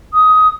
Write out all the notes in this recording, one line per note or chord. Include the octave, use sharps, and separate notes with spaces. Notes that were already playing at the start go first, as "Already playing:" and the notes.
D#6